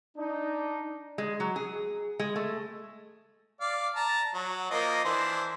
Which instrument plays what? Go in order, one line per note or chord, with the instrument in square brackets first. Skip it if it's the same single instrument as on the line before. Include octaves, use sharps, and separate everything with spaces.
[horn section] D4 D#4
[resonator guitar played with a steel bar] G#3
F#3
G#4
G#3
A3
[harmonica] D5 F5
A5 A#5
F#3
F3 A#3 D#5
E3 D4 C5